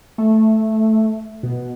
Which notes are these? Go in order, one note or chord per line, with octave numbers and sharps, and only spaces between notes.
A3
B2